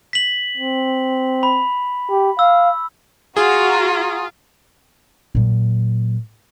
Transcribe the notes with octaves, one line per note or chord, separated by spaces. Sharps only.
B6 F#7
C4
B5
G4
F5 E6
F4 F#4 G#4 A#5
A#2 F#3